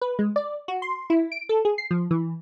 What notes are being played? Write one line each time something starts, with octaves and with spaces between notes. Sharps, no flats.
B4
G#3
D5
F#4
C6
E4
D7
A4
G#4
C7
F3
E3